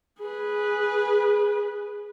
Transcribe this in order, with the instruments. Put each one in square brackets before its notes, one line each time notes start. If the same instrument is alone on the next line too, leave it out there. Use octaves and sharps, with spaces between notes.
[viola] G#4 B4